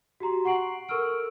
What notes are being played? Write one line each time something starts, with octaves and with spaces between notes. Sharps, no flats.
F#4 G4 A#5 C6
F#5 C#6 C7 D7 F#7
A4 A#4 C#6 E6 F6 D7